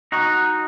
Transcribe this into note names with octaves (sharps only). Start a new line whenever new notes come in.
D#4 F#4